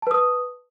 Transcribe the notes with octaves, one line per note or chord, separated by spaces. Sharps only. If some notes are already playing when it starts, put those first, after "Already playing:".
B4 A5 D#6